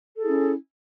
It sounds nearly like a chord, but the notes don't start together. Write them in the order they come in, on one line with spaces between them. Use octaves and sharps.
A4 G#4 E4 C#4